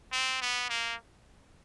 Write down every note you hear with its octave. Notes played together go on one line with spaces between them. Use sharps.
C4
B3
A#3